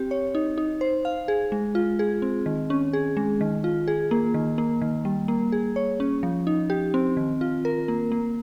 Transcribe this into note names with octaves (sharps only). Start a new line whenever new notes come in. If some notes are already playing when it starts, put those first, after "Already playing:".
Already playing: C4 G4
C#5
D#4
D#4
C5
F5
G#4
G#3
F4
G#4
C4
D#3
C#4
G#4
G#3
D#3
F4
G#4
A#3
D#3
A#3
D#3
G3
A#3
G#4
C#5
C#4
F3
D#4
G4
C4
D#3
F4
A#4
A#3
A#3